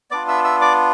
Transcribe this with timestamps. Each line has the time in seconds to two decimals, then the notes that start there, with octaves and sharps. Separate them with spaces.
0.11 B3 D4 F4 D5 D6
0.28 E5 E6
0.44 E5 E6
0.61 D5 D6